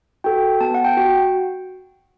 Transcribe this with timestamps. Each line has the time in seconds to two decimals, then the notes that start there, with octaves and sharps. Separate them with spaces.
0.24 F#4 A4 G5
0.60 B3 A5
0.74 F#5
0.84 G5
0.97 F#4